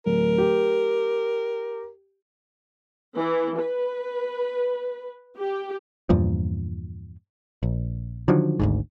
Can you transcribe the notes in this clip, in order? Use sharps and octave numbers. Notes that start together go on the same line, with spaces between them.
D1 A#4
G4
E3
B4
G4
E2 G2 A#2 F3
A#1
D3 D#3 F3 F#3
G#1 D2 G#2